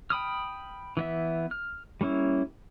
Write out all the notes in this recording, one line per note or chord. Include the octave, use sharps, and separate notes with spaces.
G5 B5 D#6 F6
E3 B3 E5
F6
G3 A#3 C#4 E4